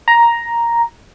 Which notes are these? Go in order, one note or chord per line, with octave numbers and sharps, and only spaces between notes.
A#5